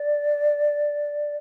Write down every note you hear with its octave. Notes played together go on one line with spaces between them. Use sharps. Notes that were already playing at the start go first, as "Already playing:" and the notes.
Already playing: D5